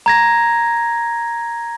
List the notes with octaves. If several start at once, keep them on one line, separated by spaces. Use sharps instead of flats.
A#5 G#6 A#6